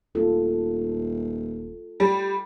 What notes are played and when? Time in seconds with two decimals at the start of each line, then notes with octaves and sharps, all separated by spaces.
0.15 D#1 F4 A4
2.00 G3